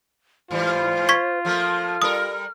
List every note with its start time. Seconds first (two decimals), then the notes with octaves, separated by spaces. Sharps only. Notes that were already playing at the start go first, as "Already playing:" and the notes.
0.51 G#2 E3 G3 F4 C5
1.09 C#6 G#6 B6
1.45 F3 A3 A#3 F6
2.02 G3 A4 A#4 D#6